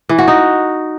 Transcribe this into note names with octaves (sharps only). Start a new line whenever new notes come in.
E3
F#4
D#4